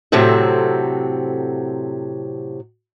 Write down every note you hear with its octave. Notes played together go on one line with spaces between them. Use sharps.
A2 C3 F#3 C4 A4